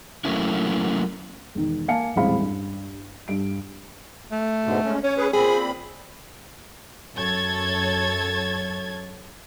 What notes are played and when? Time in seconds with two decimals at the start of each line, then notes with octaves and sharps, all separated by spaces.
0.25 F#3 A3 A#3 C#4 E4
1.55 E1 D#3
1.88 A#3 F5 G#5 A5 C#7
2.16 D#1 A1 G#3 C4 F5 B5
2.40 G2
3.28 G2 D7
4.32 A3
4.64 G#2 B2 D3
4.85 G#3 C#4
5.04 C#4 C#5
5.17 G#4 B4
5.33 A#2 C4 G#4 B5
7.16 F#2 A4 C#5 G#6 A6